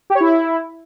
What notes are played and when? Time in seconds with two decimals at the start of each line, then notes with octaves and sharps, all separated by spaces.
0.10 G4
0.15 C#5
0.21 E4